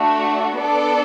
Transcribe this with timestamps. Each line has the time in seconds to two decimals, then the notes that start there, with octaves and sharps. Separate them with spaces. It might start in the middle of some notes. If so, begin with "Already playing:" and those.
Already playing: A3 D4 F#4
0.56 B3 D4 A4 D5